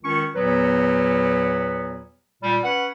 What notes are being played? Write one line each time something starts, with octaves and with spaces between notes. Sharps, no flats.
C#2 D#3 C#4 C#6
E2 A#2 F#3 B3 B4
A#2 G3
C#4 B4 F#5